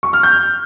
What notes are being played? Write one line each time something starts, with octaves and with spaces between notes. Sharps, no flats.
C#6
F6
G6